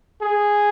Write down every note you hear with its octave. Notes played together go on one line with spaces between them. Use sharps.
G#4